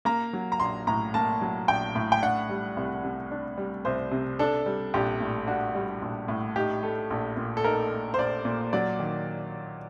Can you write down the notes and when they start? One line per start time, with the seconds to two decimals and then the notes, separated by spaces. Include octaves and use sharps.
0.05 A#3 A#5
0.33 F#3
0.52 A#5
0.60 A#1 C6
0.87 A2 A#5
1.14 A#3 A5
1.42 F#3
1.68 A#1 G5
1.95 A2
2.12 G5
2.22 D4 F#5
2.49 G3
2.77 C2
3.04 C3
3.31 D4
3.58 G3
3.85 C2 C5
4.12 C3
4.39 D4 A4
4.66 G3
4.94 A#1 G4
5.20 A2
5.47 D4 F#4
5.75 G3
6.02 A#1
6.28 A2
6.56 D#4 G4
6.83 A3
7.10 A#1
7.37 A#2
7.57 A4
7.64 D#4 A#4
7.91 A3
8.14 C5
8.19 A#1 D5
8.45 A#2
8.73 F#3 D5
9.00 D#3